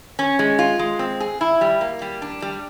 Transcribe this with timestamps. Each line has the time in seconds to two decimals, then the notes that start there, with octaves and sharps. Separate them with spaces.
0.19 C#4
0.39 G#3
0.59 F4
0.79 G#3
0.99 C4
1.20 G#4
1.41 E4
1.61 G3
1.81 A#3
2.02 G3
2.22 D4
2.42 G3